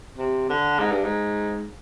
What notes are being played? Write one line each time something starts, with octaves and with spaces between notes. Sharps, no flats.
C3
D3
G#2
G2
G#2